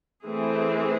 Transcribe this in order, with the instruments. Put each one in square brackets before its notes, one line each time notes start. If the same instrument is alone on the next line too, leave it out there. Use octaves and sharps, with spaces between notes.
[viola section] E3 A3 C4 G#4